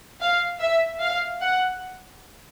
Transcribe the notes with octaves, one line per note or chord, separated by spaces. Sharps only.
F5
E5
F5
F#5